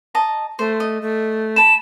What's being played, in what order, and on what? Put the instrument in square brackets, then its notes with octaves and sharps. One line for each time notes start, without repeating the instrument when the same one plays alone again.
[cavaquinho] D#5 A5 A#5
[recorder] A3 [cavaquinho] C5
[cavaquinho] D#5
[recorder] A3
[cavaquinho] A5 B5 [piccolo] E7